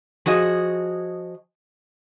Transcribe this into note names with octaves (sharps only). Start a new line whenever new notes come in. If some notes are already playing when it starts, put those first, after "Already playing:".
F3 F#4 G#4 D#5